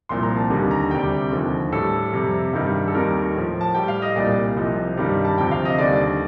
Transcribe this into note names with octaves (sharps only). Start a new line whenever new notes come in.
C2 A#2 F3 C6
A#5
A5
D#2 D3 G3
A#5
D2 C3 G3 G5
D#2 D3 F3
A2 G3 A4
F2 C3 G3
G2 D#3 G3
A4
D#2 D#3 G3 A#4
A2 F3
A5
A2 G3 G5
F5
D#5
C2 A#2 G3 D5
C2 C3 F3 D#5
G2 D#3 G3
A5
D2 C3 F3 G5
F5
D#5
D#2 D3 G3 D5